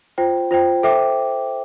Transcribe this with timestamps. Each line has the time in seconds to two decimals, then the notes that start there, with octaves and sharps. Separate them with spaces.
0.18 F4 C5 G5
0.51 F4 C5 G5
0.83 A4 C5 E5 G5 D6